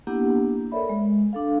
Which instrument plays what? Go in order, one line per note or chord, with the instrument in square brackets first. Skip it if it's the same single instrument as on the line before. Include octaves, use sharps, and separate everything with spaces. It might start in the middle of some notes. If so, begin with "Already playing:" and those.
[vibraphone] A#3 B3 D4 E4 G4 F#5
A4 A#4 C#5 D5 E5 B5
G#3
D4 A4 F5